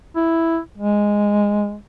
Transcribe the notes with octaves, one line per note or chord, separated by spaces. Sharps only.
E4
G#3